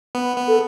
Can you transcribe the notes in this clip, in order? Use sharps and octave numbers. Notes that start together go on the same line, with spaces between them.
B3
B3
A4